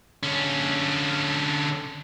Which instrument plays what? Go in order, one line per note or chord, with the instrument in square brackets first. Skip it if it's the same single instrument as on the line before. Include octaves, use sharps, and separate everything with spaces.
[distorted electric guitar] D3 C#4